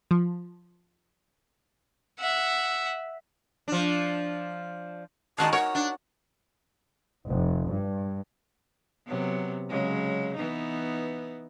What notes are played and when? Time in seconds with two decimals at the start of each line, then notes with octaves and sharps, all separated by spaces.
0.11 F3
2.19 E5 F#5
3.68 F3 D4
5.38 D#3 G#3 D#4 F#4 F5 A5
5.53 A#4 C#5 F#5
5.75 D4
7.27 F1
7.70 G2
9.06 C3 F#3 B3
9.69 C#3 F#3 G#3
10.36 E3 B3 D#4